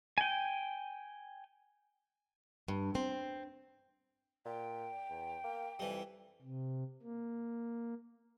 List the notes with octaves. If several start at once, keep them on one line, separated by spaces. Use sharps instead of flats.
G5 G#5
G2
C4
A#2 G5
E2
A#3
F2 E3 G3
C3
A#3